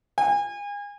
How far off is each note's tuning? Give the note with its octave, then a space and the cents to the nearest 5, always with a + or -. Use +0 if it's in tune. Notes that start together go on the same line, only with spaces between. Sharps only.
G#5 -35